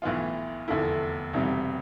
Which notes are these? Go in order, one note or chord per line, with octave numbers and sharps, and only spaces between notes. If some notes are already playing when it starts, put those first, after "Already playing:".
B1 A2 E3 B3 F4
F1 E2 D3 A3 E4
E1 D2 C3 G3